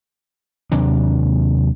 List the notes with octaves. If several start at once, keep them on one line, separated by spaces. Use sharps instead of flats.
D#2 C3 F#3 D4